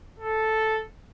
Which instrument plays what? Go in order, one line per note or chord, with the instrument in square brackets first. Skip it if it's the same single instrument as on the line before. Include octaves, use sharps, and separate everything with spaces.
[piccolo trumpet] A4